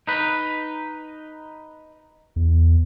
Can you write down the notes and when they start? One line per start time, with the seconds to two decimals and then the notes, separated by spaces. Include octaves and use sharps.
0.07 D#4 B4
2.36 E2